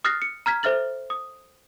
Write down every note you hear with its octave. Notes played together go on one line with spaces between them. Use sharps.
D#6 F6 F#6 A6 A#6 C7
C#7
A#5 F6 G#6 B6
A4 C5 E5 F6 A6 F#7
D#6